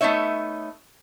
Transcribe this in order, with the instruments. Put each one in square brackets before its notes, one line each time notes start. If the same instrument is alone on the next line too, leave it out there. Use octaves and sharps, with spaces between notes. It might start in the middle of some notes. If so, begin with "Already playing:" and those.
[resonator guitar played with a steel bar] A3 B3 D#4 C#5 E5